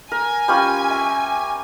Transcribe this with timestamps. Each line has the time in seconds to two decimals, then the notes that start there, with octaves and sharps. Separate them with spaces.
0.11 A#4 G#5
0.48 G3 C#4 F4
0.90 E5